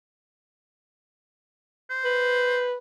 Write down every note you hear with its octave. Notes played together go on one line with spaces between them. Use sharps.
C5
B4